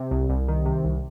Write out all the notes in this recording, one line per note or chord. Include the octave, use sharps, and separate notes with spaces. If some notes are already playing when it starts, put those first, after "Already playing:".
Already playing: C3
C2
C2
D#3
C3
C2